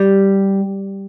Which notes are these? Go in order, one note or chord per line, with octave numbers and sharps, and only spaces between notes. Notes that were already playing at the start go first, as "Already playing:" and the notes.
Already playing: G3